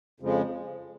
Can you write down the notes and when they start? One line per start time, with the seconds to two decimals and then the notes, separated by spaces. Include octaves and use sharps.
0.20 F2 C#3 F3 G#3